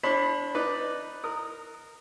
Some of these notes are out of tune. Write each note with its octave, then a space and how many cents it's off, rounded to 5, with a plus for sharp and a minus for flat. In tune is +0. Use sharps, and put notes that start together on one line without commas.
D4 -20 C5 +40 B5 +0
D#4 +0 B4 +0 D5 +0
A#4 -15 D#6 -15